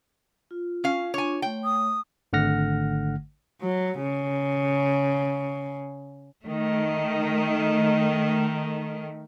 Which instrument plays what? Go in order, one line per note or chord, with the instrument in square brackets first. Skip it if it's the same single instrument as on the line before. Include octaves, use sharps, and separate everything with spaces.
[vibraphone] F4
[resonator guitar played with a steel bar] C#4 F5
[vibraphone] D4 F4 [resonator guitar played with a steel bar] C#5 G#5
[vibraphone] A3 C#5 [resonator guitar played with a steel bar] G5
[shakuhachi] D#6
[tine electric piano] G#1 D3 A3 F#5 F6 A#6
[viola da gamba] F#3
C#3
[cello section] D#3 A3